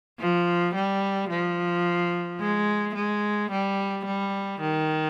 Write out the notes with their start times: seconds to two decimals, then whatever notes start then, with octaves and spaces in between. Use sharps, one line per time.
0.20 F3
0.74 G3
1.30 F3
2.40 G#3
2.95 G#3
3.51 G3
4.06 G3
4.60 D#3